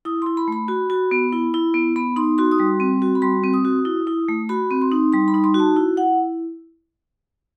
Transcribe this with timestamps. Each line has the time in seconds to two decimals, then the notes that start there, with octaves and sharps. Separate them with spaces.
0.05 E4 D#6
0.22 E4 C6
0.37 B5
0.48 A3 B5
0.68 F#4
0.90 F#4
1.11 B3
1.33 E4
1.54 E4
1.74 B3
1.96 B3 B5
2.16 D#4 C6
2.38 F#4 C6
2.52 D#6
2.58 G3 C6
2.80 C4
3.02 F#4
3.15 B5
3.22 G3 C6
3.44 C4
3.54 D#6
3.65 F#4
3.85 E4
4.07 E4
4.28 A3
4.49 F#4 B5
4.71 C4
4.82 C6
4.92 D#4
5.13 G3 C6
5.28 B5
5.34 D#4
5.44 C6
5.54 F#4
5.60 A5
5.76 E4
5.97 E4 F#5